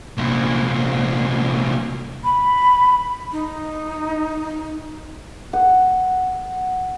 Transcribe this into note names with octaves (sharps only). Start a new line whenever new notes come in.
C2 A#2
B5
D#4
F#5